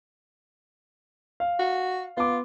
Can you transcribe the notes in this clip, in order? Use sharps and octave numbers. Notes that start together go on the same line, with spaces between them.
F5
F#4
B3 F4 D6